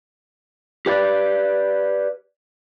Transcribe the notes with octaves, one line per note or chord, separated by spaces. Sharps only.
G4 B4 D5